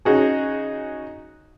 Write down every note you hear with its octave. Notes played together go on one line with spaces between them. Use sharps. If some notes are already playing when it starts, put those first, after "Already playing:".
C#3 D#4 F#4 G#4